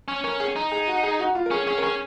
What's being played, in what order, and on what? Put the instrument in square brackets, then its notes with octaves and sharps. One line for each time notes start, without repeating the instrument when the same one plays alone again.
[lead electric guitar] C#4
[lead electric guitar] C#4 [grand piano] A#4
[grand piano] G#4
[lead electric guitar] D#4
[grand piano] G#4
F#4
G#4
F#4
F4
A#4
[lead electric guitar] C#4 [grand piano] G#4
[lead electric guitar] C#4 [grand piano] G#4
[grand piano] A#4
[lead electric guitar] C#4 [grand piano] G#4